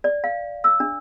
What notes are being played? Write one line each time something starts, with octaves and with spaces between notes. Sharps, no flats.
D5
F5
E6
D4